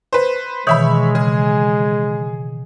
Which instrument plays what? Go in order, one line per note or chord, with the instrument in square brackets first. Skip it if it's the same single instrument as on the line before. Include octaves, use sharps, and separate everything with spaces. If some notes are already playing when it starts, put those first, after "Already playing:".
[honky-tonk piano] B4 C5
[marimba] B2 D#3 E3 [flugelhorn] G#3 [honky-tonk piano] C#5 E5 B5
[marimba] C#3 [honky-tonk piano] G#4